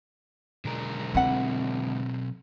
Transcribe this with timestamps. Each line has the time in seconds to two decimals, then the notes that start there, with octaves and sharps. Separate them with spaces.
0.65 B1 D3 G#3 A#4
1.15 C4 E4 F#5